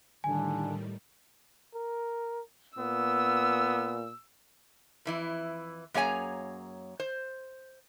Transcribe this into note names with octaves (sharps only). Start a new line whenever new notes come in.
A2 D3 D#3 G3 G#5
A#4
A#2 B3 E6
F2 E3 E4
F#2 A#3 G#4 C#5 G#5 A#5
C5